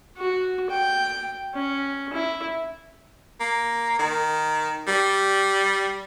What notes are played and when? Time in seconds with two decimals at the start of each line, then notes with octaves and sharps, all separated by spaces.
0.18 F#4
0.71 G5
1.55 C#4
2.13 E4
3.40 A#3
3.99 D#3
4.87 G3